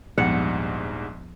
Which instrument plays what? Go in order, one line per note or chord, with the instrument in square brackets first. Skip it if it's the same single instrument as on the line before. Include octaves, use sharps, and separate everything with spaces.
[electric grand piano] A#1 G#2 G3 [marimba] D#2 F3 B3 [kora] F#5